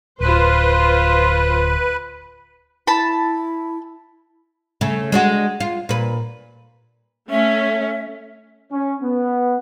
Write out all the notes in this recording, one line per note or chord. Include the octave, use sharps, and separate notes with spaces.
D1 F4 B4 C5
E4 A5 B5
C#3 A3
G#3 D4 F#4
F4
A#2 B4
A3 C#4 E5
C#4
B3